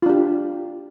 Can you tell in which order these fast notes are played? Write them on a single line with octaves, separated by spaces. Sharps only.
F4 D4 G4